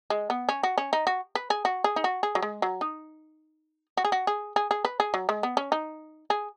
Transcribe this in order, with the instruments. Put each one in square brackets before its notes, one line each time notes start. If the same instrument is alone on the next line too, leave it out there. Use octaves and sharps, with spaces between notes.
[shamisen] G#3
B3
C#4
F#4
C#4
D#4
F#4
B4
G#4
F#4
G#4
D#4
F#4
G#4
F#3
G#3
F#3
D#4
F#4
G#4
F#4
G#4
G#4
G#4
B4
G#4
F#3
G#3
B3
C#4
D#4
G#4